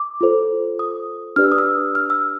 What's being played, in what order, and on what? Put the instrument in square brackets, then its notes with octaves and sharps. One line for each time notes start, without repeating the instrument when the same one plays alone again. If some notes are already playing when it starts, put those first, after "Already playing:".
Already playing: [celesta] D6
F4 A4 C5
D#6
D4 G4 B4 D5 F6
E6
D#6
E6
F6
E6